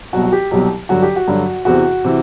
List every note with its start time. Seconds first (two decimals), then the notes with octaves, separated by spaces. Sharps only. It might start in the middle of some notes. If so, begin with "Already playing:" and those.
0.13 C2 B2 F#3 F#4
0.23 F#4
0.32 G4
0.51 C2 B2 F#3 G4
0.89 G2 D3 F#3 F#4
1.02 G4
1.16 F#4
1.28 G2 D3 F#3
1.65 E2 C3 E3 F#4
2.04 C3 E3